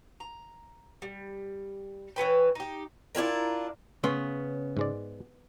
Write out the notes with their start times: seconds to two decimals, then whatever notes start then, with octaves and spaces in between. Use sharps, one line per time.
0.20 A#5
1.02 G3
2.16 E3 C#4 B4 G5
2.55 D#4 G4
3.15 D4 E4 F4 A#4
4.04 C#3 B3 C#4 C6
4.77 G#2 G#3 D5